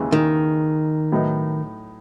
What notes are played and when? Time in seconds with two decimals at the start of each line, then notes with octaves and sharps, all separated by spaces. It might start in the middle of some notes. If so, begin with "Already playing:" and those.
Already playing: D#2 C#3 E3 G#3
0.12 D#3
1.12 A2 F#3 B3 D#4